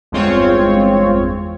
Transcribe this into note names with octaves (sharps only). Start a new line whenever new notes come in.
G1 E2 G#3 C4 F4 C#5